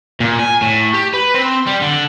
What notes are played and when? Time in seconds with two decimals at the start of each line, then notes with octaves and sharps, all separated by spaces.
0.20 A#2
0.39 G#5
0.62 A2
0.94 G4
1.14 B4
1.34 C4
1.66 G3
1.81 D3